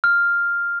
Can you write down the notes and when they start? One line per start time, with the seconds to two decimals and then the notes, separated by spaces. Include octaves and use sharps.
0.04 F6